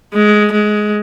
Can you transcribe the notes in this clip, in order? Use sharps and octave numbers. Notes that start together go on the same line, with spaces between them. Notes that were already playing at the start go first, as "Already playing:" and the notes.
G#3
G#3